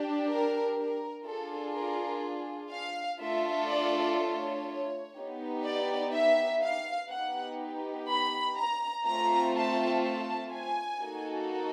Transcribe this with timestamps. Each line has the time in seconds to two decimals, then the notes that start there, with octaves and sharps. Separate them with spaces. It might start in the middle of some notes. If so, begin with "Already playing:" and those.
Already playing: D4 G4
0.28 A#4
0.76 A#4
1.25 D4 F4 G#4 A4
1.73 A#4
2.71 F5
3.20 A3 D4 F4 A4 E5
3.69 D5
4.17 C#5
5.15 B3 D#4 G4
5.64 D5
6.12 E5
6.62 F5
7.10 B3 D#4 G4 F#5
8.08 B5
8.56 A#5
9.05 A3 C4 F4 A#5
9.54 A5
10.03 A5
10.52 G#5
11.00 A#3 D#4 F#4 A4